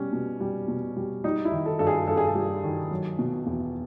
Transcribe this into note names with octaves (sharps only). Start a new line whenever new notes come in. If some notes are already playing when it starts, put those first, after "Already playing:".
Already playing: B2 G3 C#4
B2
G3
B2
G3
G3 D#4
E4
D#3
A4
G2 A4
G#4
G2 A4
G#4
A4
G3
D#3
F#3
B2
E2